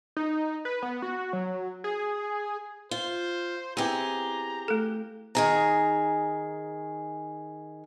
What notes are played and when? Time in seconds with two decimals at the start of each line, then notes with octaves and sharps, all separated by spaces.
0.17 D#4
0.65 B4
0.82 B3
1.02 F#4
1.33 F#3
1.84 G#4
2.91 F4 C5
3.77 B3 C4 E4 G4 G#4 A#5
4.68 A3 A4
5.35 D#3 G#4 A#5